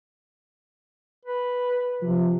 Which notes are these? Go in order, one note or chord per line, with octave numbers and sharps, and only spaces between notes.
B4
C3 F3